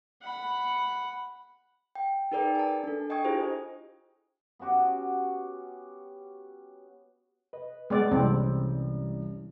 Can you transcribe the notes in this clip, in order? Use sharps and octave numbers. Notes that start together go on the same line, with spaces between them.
F#5 B5
G5
D#4 G#4 A#4 B4 D5 G5
G#5 A5
D4 A4
D#5 G5 G#5 C#6 D#6 G#6
D4 E4 F4 G4 G#4 C5
B3 C#4 F#4 G4
B4 D#5
G#3 B3 D5
C2 E3 G3 C4 C#4